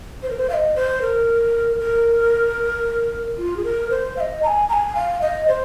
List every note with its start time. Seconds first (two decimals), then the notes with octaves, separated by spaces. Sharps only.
0.23 C5
0.30 A#4
0.38 C5
0.50 F5
0.54 D#5
0.76 C5
1.02 A#4
1.80 A#4
3.38 F4
3.57 G#4
3.64 A#4
3.90 C5
4.17 F5
4.21 D#5
4.43 A#5
4.47 G#5
4.69 A#5
4.73 G#5
4.95 F5
5.22 D#5
5.48 C5